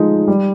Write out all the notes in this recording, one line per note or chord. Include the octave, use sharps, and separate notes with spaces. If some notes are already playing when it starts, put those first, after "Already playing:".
Already playing: F3 G#3 D#4
G3